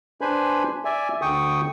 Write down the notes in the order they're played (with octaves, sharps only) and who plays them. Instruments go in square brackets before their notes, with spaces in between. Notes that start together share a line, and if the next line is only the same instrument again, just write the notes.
[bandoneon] D4 B4 C5 G#5 B5
D5 E5 G#5
D2 D3 G5 C#6 D#6